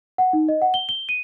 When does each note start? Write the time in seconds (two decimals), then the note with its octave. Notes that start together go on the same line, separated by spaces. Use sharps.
0.18 F#5
0.33 D#4
0.49 D#5
0.62 F#5
0.74 G7
0.89 G7
1.09 D#7